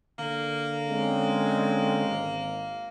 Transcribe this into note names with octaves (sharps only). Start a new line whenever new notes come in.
D3 A#3
G#3 C4 C#4
G#1